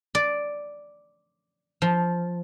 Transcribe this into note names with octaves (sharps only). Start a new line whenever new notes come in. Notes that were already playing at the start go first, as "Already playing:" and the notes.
D5
F3